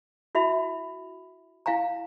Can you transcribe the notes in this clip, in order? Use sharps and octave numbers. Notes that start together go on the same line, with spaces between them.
E4 F#4 E5 B5
E4 F5 G#5 A#5